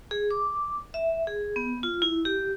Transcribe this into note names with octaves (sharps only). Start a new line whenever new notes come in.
G#4
D6
E5
G#4
B3
F4
E4
G4